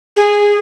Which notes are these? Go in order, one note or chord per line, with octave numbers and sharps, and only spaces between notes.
G#4